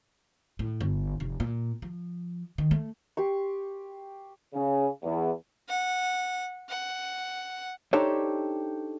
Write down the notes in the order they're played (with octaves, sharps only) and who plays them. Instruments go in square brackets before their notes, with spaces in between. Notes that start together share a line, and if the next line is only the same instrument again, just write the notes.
[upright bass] A2
G1
F1
A#2
F3
D#3
A3
[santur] G4 C6 C#6
[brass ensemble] C#3
E2
[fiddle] F#5
F#5
[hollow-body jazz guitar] D4 D#4 G4 A4 C5 C#5